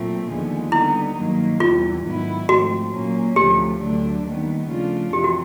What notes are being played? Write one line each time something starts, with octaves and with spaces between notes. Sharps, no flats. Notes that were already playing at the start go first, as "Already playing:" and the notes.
Already playing: A#2 F#3 A3 C4 F4
D#2 D3 F3 G#3 B3
D3 G3 B3 D#4 E4
G2 D#3 F#3 A#3
E2 C3 E3 G3 F4
G#2 D#3 F#3 B3 E4
G#2 F3 A3 C4 F#4
A#2 F#3 A#3 C#4
D2 C3 F3 A3 G4
D2 D3 F#3 A3 D4
D#2 D#3 G3 B3
C#3 F3 A3 D4 F4
F2 C3 E3 G4
F#4